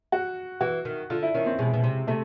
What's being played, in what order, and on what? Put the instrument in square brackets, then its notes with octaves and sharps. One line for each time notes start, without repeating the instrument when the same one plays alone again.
[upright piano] F#4
[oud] E3 [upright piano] F#4
[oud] D#3
[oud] D3 [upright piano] F4
[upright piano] E4
[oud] D#3 [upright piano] C#4
[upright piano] C4
[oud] B2 [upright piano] G#3
[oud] B2
C3
[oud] C3 [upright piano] A3